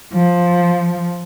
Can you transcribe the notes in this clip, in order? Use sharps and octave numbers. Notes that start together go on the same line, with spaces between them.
F3